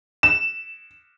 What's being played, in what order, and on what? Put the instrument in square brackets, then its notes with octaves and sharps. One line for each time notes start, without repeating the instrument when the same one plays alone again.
[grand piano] E7